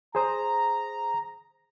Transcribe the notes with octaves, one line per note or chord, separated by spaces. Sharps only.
G#4 C5 A#5 D#6